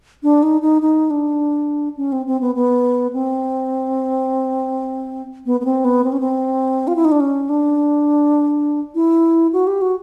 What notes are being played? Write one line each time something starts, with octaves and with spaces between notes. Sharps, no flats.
D4
D#4
D#4
D#4
D4
C#4
C4
C4
B3
B3
C4
B3
B3
C4
B3
C4
C#4
C4
F4
E4
D#4
D4
C#4
D4
E4
F#4
G4
F#4